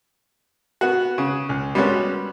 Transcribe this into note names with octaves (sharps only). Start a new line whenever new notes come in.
B3 F#4
C#3
C#2
G3 G#3 B3 C#4 F#4